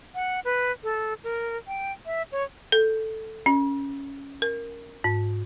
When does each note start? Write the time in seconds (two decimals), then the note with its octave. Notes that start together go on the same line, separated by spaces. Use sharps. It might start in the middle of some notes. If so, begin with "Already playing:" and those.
0.15 F#5
0.45 B4
0.83 A4
1.24 A#4
1.67 G5
2.06 E5
2.32 C#5
2.72 A4
3.46 C#4
4.42 A#4
5.04 G#2